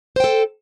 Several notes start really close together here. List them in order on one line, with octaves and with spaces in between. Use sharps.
C5 G5 A4